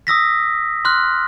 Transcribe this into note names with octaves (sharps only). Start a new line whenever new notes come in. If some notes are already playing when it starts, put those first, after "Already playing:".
D#6 E6 A#6 B6
C6 F6 F#6